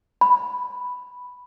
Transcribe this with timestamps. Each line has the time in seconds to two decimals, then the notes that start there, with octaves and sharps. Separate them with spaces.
0.21 B5